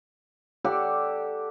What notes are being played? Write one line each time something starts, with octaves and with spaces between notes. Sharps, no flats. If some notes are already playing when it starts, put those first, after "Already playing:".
G4 A4 D5 F#5